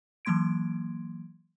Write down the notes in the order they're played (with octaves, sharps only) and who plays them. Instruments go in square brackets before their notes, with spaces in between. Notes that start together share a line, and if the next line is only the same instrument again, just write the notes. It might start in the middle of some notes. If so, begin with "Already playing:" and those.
[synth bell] E3 F#3 A#3 C6 G#6 D7